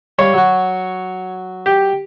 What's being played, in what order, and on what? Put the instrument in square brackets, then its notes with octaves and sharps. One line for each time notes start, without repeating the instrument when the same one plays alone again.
[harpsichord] G3 F5 [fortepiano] C#5
[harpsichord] F#3 F#4
[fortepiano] G4